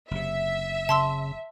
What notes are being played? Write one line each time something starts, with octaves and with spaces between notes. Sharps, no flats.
F#1 C3 E5
C#3 A5 C6 E6